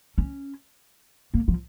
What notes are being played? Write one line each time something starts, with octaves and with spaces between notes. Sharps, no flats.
C#4
A#3
F3